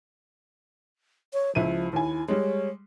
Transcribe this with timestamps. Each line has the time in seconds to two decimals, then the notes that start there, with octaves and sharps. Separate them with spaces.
1.33 C#5
1.55 C#2 F3 E4 D#7
1.93 D#2 E4 G#5
2.28 G3 G#3 C#5